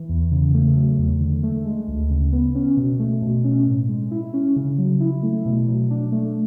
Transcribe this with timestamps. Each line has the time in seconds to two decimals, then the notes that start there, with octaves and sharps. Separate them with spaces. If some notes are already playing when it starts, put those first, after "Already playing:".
Already playing: E3
0.09 E2
0.31 C#3
0.54 A3
0.76 F#3
0.99 E2
1.20 D3
1.43 A3
1.65 G#3
1.88 D2
2.10 C#3
2.33 B3
2.55 C#4
2.77 B2
2.99 A3
3.22 B2
3.44 C#4
3.66 A2
3.89 G#3
4.11 E4
4.34 C#4
4.56 C#3
4.78 F#3
5.00 E4
5.23 A3
5.45 B2
5.68 F#3
5.90 D4
6.12 A3